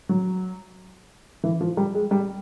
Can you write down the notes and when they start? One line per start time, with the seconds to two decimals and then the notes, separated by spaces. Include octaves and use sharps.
0.09 F#3
1.44 E3
1.61 F3
1.77 G3
1.95 G#3
2.11 G3